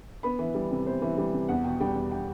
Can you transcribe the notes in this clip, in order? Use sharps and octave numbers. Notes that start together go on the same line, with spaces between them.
B3 B5
E3
G3
C3
B3 C5
E3
G3
C3
E2 F#5
B2 G5
G3 G5
E2
G5